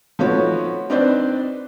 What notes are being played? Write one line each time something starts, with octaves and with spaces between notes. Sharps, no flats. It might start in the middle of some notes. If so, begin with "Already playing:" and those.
F3 A3 B3 D#4 F#4 C#5
C4 D4 D#4 B4 C5 D5